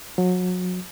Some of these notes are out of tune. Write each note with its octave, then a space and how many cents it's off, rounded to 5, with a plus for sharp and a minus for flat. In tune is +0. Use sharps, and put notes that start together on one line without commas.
F#3 -30